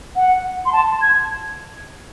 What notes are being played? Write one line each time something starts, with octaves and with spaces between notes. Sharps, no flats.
F#5
C6
A5
G#6